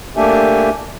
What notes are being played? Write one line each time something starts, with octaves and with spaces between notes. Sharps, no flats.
A3 A#3 D4 G4 E5 G#5